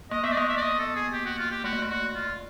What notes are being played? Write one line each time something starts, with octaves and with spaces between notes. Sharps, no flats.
A#3 D#5
B3 E5
D5
A#3 D#5
E5
D5
D#5
A4
G#4
G4
F#4
F4
G4
A3 F#4
A#3
A3
F#4
F4